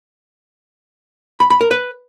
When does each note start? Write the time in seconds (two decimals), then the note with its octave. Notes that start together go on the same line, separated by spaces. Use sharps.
1.40 B5
1.50 B5
1.61 A#4
1.71 B4